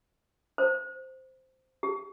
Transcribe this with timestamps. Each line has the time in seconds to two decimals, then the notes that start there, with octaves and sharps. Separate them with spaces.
0.58 C5
1.83 G4